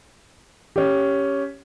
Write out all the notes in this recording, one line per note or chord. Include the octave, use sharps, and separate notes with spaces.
C#4 G4